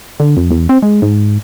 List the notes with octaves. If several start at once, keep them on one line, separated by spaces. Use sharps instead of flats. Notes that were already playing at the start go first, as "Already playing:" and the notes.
D3
F2
E2
C4
G#3
G#2